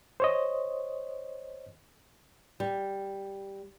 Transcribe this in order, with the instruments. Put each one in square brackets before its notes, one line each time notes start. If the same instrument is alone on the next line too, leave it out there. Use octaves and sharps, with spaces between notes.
[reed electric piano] C5 C#5 D#5
[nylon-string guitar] G3